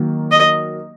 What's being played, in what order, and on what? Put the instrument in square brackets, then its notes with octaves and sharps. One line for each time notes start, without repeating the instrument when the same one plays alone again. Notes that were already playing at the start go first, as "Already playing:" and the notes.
Already playing: [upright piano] D#3 F#3 A#3
[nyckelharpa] D#5